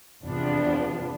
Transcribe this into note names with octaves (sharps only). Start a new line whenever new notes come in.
E2 C3 F3 B3 D4